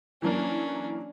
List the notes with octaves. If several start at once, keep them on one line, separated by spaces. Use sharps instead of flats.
E3 F#3 A#3 C#4 D4